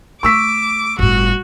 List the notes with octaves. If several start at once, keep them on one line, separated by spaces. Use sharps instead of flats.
A3 C#6 D6 E6 B6
G1 A2 F#4